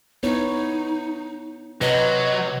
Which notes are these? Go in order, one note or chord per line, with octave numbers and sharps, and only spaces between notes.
B3 D#4 E4 C#5
C3 F#3 B4 D#5